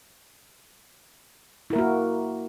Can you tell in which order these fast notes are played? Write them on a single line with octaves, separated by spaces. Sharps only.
E4 A#4 A#3 F#4